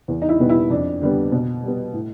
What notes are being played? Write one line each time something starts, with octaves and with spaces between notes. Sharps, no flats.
E2
D#4
E4
B2 G3 B3
E4
F2 D4
D3 G3 B3
B2
G3 B3
A2